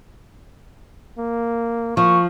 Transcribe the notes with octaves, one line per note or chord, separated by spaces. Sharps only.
A#3
F3 A#3 C#6